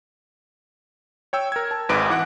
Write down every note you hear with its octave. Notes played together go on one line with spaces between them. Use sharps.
C#5 G5 E6
A#4 G#6
A5
G#1 G#2 B4 D6 D7
E3 F#5 F#6